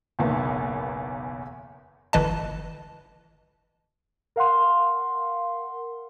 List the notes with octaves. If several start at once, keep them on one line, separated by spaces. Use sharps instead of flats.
F#1 B1 E2 A#3 B3
G1 E3 D#5 A5
A#4 F5 F#5 C6